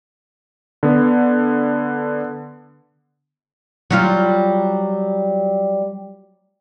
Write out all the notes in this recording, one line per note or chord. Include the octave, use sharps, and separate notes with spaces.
D3 B3
F#3 G3 F4